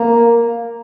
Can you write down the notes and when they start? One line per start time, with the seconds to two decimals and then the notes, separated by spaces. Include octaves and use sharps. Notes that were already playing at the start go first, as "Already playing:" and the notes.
Already playing: A#3